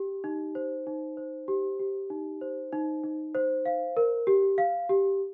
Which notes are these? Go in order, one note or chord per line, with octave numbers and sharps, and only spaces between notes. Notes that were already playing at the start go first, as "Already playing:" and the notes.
Already playing: G4
D#4
C5
D#4
C5
G4
G4
D#4
C5
D#4
D#4
C5
F5
A#4
G4
F5
G4